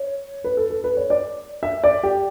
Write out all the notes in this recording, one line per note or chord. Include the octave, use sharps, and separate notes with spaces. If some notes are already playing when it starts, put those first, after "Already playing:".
Already playing: C#5
B4
A4
A4
B4
C#5
D5
E5
D5
G4